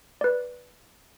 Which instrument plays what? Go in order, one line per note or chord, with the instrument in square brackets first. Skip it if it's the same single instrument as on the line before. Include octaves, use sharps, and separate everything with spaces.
[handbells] B4 D5